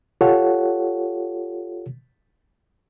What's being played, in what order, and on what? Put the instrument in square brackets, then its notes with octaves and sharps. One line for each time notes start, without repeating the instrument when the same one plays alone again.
[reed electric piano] F4 G4 A4 C#5 F#5